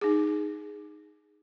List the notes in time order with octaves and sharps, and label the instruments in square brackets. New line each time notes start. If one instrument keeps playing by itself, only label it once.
[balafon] D#4 G#4